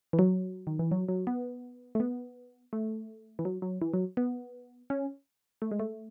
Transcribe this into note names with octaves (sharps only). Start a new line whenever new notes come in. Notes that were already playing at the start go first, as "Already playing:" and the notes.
E3
F#3
D#3
E3
F#3
F#3
B3
A3
B3
A3
E3
F#3
F#3
E3
F#3
B3
C#4
A3
G#3
A3